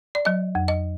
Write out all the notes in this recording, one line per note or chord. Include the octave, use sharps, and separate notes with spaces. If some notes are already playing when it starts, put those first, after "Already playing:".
D5
F#3 D#5
F2
D#5